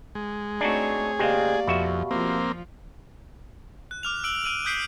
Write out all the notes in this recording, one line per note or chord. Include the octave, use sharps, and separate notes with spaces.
G#3
A3 C4 D4 D#4 F#4 G#4 C#5
C#2 G#3 A#3 C4 G4 D5 F5
F2 B2 F#4 E5
F3 A#3 C4 F4
F#6
D6 F6 F7
E6 D7 F#7
F6 D7 D#7 F7 F#7
D#6 F#6 G6 B6 C7 D7